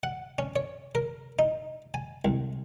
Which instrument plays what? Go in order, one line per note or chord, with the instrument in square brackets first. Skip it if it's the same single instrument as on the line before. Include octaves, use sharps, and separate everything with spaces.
[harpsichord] F#5
C#4
C#5
A#4
D#4
G#5
C2